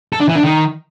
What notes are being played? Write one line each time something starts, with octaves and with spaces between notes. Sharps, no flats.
A4
D4
E3
D4
D#3